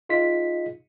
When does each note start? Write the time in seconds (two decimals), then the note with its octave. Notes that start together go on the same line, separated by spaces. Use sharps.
0.09 D#4 F4 G#4 D#5 B6